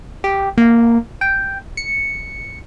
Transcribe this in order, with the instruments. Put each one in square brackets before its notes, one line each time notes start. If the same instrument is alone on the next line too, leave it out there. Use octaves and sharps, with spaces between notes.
[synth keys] G4
A#3
G5
C#7